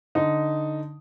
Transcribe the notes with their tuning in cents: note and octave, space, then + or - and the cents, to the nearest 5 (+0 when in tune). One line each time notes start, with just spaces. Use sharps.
D3 +0 D#4 +0